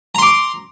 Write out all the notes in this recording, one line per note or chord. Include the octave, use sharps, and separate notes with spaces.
A#5 C6 D6